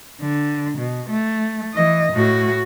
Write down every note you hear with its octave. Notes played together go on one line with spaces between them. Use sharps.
D3
B2
A3
E3 D#5
A2 F#4